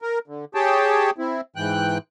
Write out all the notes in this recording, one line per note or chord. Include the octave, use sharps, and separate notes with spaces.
A#4
D3
G4 G#4 C#5 G5 A5
C4 E4
G#2 E3 G5 F#6